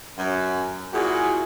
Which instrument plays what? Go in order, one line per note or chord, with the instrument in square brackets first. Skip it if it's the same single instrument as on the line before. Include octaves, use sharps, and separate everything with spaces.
[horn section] F#2
A#2 E4 F#4 G#4